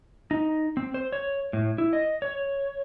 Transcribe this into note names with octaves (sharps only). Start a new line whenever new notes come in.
D#4
C4
C5
C#5
A2
E4
D#5
C#5